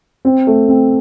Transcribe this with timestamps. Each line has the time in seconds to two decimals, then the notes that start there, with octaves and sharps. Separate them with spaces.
0.25 C4
0.47 A3
0.69 C4